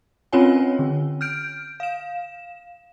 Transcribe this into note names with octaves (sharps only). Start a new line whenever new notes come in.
C4 C#4 F4 C#5 G#5
D3
F6 G6 D7
F5 E7